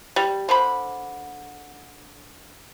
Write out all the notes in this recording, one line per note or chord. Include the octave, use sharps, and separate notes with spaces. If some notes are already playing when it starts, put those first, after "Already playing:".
G3
D3 C5 B5